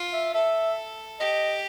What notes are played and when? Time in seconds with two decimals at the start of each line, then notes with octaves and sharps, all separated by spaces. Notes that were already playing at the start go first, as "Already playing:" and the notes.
Already playing: F4
0.13 E5
0.34 A4 E5
1.20 G4 D#5